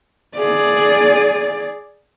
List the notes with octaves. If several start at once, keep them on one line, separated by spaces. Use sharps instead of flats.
G#4 D5